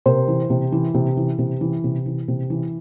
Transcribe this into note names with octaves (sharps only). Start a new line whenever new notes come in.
C3 A#4 C5
E3
C3
E3
C3
E3
C3
E3
C3
E3
C3
E3